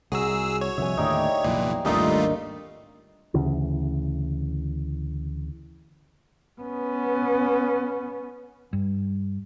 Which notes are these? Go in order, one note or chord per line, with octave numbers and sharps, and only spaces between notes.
C2 F#4 G#4 A#5 E6
C#5
F1 C2 F2 E5 G#5
D#2 A2 D3 D#4 G4 D5
F1 B1 A#2 E3
G#1 D#2 G3 A3 D4 D#4 F4 A#4
D2 C#3 E3
B3 C#4
G2